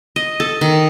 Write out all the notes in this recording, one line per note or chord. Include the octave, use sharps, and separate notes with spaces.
D#5
A4
D#3